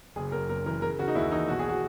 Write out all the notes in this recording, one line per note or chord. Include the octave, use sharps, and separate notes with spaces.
F#1 G#4
F#2 A#4
F#1 A#4
E3 A#4
C#3 A#4
C#3 F#4
D#4
D#2 E4
E3 D#4
B1 F#4
G#4
F#4